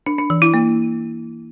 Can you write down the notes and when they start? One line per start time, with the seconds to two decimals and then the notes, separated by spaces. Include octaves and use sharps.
0.06 D4
0.18 D4
0.30 E3
0.42 E4
0.54 A#3